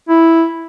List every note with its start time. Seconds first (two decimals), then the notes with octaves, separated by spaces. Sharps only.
0.09 E4